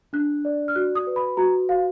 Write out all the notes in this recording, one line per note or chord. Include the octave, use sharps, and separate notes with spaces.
D4 F#6
D5
F6
F#4 F#6
D#6
B4
B5
F#4 A#5
F#4 F5